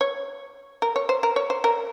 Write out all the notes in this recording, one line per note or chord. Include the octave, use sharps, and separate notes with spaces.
C#5
A#4
C#5
C5
A#4
C#5
C5
A#4